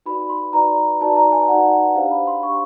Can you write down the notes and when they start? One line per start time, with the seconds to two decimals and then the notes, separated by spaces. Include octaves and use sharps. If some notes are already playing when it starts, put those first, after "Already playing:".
0.06 D#4 F#4 B4 D5 B5
0.29 C6
0.53 D#4 F#4 B4 D5 A#5
1.01 D#4 F#4 B4 D5 A5
1.16 A#5
1.32 G#5
1.48 D#4 F#4 B4 D5 F#5
1.95 D4 G4 C5 F5
2.11 B5
2.27 C6
2.43 D4 G4 C5 C#6